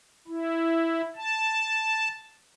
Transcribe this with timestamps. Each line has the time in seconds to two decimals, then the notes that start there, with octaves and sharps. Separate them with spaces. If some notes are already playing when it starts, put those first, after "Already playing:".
0.28 E4
1.16 A5